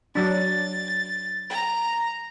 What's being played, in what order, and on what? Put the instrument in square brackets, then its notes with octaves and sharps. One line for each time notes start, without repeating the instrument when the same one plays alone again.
[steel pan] F#3 D4 [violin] A6
[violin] A#5